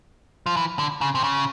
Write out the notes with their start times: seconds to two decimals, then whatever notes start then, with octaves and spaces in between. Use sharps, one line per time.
0.46 F3
0.57 E3
0.79 D3
1.01 C#3
1.15 C3
1.24 C#3